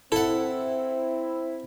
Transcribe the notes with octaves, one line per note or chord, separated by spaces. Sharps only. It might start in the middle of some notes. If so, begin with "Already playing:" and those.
C4 E4 A4 F#5